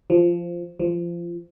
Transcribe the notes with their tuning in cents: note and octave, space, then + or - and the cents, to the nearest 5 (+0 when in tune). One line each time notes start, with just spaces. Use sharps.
F3 -10
F3 -20